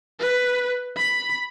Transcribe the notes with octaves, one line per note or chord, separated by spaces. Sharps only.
B4
B5